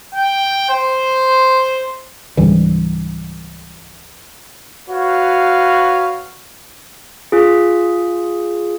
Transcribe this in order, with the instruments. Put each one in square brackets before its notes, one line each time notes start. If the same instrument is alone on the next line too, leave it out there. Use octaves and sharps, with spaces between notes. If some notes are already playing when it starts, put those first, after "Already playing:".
[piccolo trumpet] G5
C5
[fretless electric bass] C#2 G#2 E3 G3
[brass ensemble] F#4 B4 C#5 F5
[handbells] F4 G#4